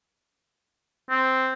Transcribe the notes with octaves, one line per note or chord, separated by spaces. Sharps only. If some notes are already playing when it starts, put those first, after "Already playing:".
C4